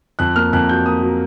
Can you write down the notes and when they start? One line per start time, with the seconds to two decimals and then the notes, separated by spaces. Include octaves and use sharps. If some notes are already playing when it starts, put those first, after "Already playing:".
0.19 F2 F#6
0.35 A#3 F6
0.53 F2 F#6
0.69 F#3 G6
0.86 A#3 D#6
1.03 F#3